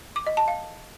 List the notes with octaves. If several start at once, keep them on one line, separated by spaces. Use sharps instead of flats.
D6
D#5
A5
F5